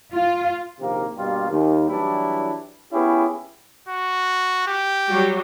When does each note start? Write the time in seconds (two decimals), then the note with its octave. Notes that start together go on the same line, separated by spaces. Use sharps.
0.13 F4
0.80 A#1 D#2 C3 A#3
1.17 G2 B2 G3 A#3 F4
1.50 D#2
1.89 E3 F#3 G3 D4 E4
2.92 B3 C#4 E4 G4 G#4
3.88 F#4
4.67 G4
5.08 F#3 G3 F#4